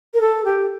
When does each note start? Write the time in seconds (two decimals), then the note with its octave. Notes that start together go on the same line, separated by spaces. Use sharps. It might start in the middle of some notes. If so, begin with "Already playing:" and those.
0.14 A#4
0.20 A4
0.44 G4